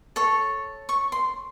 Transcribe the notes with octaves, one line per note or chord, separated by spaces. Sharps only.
A4 C#5
C#6
C6